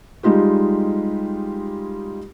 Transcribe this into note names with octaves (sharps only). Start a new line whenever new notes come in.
G3 G#3 D#4 F4 G4